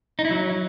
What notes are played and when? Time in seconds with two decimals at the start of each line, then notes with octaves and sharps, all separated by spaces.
0.19 D#4
0.25 E4
0.31 F#3